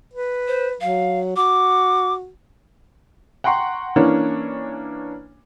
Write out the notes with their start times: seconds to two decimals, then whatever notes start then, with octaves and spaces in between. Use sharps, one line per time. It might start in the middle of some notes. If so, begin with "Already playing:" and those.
0.13 B4
0.48 C5
0.81 F#3 F5
1.36 F#4 D6
3.44 F#5 G5 A#5 C6 C#6
3.96 E3 A#3 C#4 D4 C#5